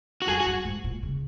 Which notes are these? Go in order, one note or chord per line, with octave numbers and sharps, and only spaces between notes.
F#4
F#2 G#4
F#4
F#2
G#2
A#2
C#3